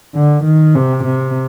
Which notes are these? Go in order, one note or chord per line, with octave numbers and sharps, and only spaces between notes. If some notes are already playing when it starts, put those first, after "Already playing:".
D3
D#3
C3
C3